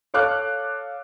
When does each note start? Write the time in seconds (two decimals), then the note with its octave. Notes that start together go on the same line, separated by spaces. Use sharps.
0.14 A4 C#5 F5 D6 F6 F#6